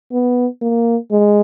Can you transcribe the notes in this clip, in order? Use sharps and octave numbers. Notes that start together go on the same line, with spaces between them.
B3
A#3
G#3